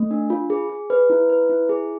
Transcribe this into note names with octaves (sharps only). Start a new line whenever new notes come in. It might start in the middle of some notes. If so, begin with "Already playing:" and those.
Already playing: A3
D4
F4
G#4
G#4
B4
E4
B4
E4
G#4